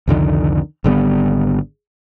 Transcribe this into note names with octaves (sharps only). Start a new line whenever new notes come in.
C2 F2 D3 D#3
G#1 D3 G3 B3